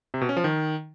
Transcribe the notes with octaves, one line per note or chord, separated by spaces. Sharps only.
C3
B2
C#4
F3
D#3